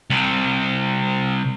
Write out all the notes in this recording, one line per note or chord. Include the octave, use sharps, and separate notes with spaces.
C2 C3